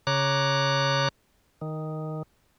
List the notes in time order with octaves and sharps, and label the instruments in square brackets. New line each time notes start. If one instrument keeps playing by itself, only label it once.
[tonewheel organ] C#3 C#5 A#5 D6 F#6
D#3